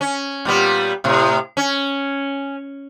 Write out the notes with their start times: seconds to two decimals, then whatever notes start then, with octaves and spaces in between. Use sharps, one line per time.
0.01 C#4
0.45 A#2 G3 B3
1.04 A2 C3
1.57 C#4